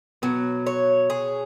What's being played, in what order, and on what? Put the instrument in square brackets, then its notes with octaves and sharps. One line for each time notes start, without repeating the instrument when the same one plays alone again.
[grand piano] B2 B3 [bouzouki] F#3
[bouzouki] C#5
G#4